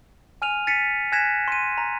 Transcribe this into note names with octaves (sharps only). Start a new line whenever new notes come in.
G#5 F6 D#7 F7
A6 B6 C#7 D#7
G#5 F#6 G#6 A#6 B6 E7
C6 D#7
A#5